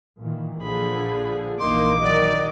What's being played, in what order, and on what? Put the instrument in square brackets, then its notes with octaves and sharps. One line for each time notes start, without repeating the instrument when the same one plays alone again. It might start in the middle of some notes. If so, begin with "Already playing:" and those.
[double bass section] A#2 D#3 E3
[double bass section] A#1 [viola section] D3 F3 G#4 [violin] B5
[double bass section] F1 A#1 E3 [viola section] A#3 D#4 [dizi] C6 [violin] D6
[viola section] D#3 F#3 D#5 [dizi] D5